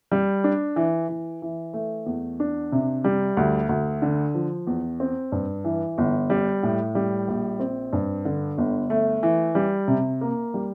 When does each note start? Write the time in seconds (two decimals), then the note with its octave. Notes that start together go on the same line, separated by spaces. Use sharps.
0.11 G3
0.44 D4
0.76 E3
1.09 E3
1.42 E3
1.73 A3
2.06 E2
2.40 D4
2.72 C3
3.04 G3
3.37 D2
3.69 D2
4.02 D3
4.35 F3
4.67 E2
5.00 C4
5.32 G2
5.64 E3
5.98 G1
6.30 G3
6.63 A2
6.95 G3
7.28 A#1
7.60 C4
7.93 G2
8.25 D3
8.58 G1
8.90 A3
9.23 E3
9.55 G3
9.88 C3
10.21 A#3
10.54 G3